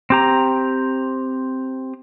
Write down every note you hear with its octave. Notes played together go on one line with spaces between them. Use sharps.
C4 G4 A#5